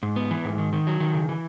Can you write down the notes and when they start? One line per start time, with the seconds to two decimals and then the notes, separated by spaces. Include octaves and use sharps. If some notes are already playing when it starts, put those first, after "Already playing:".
0.03 G#2
0.16 B3
0.31 E3
0.45 G#2
0.58 D#3
0.73 D#3
0.87 F#3
1.00 D#3
1.14 C#3
1.29 E3